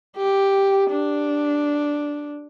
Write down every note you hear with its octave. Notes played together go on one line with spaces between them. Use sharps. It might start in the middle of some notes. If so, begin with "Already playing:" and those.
G4
D4